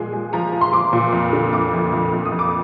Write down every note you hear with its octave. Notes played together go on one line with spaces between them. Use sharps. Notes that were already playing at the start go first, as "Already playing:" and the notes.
Already playing: A#2 F3 G#3 G#5
G#3
F3 A#5
F3
C6
F3 D6
A#2
F2
D3
F2 D6
F2
F2
F2
D#6
F2
D6